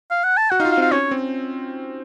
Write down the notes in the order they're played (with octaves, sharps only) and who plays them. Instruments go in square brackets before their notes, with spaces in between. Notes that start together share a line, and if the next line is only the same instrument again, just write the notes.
[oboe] F5
F#5
A5
[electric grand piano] F#4 [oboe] F#5
[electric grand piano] D#4 [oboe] F5
[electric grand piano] F4
[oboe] F5
[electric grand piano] C4
[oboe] F5
[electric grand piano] C#4 [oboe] C#5
[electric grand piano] C4